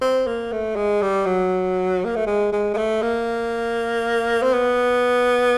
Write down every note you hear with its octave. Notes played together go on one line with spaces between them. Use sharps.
C4
A#3
A3
G#3
G3
F#3
A#3
A3
G#3
G#3
G#3
A3
A#3
C4
B3